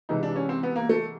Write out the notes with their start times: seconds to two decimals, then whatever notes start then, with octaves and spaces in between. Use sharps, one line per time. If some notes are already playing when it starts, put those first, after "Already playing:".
0.09 C2 C3 E3 G#3 D#4
0.23 D4
0.36 C#4
0.49 C4
0.63 B3
0.76 A#3
0.89 A3